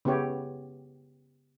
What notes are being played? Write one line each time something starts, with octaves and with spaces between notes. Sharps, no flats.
C#3 B3 E4 G4 C#5